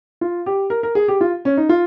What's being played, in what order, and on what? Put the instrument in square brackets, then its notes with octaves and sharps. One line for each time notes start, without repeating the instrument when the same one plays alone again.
[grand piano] F4
G4
A#4
A#4
G#4
G4
F4
C#4
D#4
F4